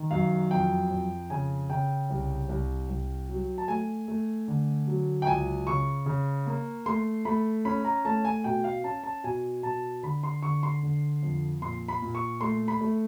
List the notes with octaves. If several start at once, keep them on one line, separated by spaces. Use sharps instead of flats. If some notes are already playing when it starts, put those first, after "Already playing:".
Already playing: D#3
F#2 F5
F2 G5
F2
C#3 G#5
C#3 G5
C2
C2
C2
F#3
A5
A3 G#5
A3
D3
F#3
G5
C#2 G#5
C#3 C#6
C#3
A#3
A3 C6
A3 B5
C#4 B5
A#5
A3 A5
G#5
B2 G5
F5
C#4 A5
A5
B2 G#5
B2 A5
D3 B5
C6
D3 C#6
C6
D3
F2
A#2 C6
B5
A#2
C#6
A3 C6
B5
A3